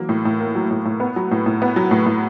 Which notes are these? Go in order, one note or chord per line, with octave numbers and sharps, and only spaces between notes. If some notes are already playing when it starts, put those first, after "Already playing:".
Already playing: E3 F#3 A#3
A2
A2
A#3
F#3
A2
A2
B3
F#3
A2
A2
B3
F#3
A2
A2